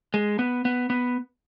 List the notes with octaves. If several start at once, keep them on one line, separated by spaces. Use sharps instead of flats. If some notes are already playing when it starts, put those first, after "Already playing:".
G#3
B3
B3
B3